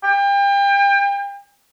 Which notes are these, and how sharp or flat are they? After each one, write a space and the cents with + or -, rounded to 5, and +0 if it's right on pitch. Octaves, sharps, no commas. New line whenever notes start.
G5 +35